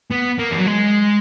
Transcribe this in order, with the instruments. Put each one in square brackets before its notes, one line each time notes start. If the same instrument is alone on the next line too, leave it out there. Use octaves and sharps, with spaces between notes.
[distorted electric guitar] B3
A#3
E3
F#3
G#3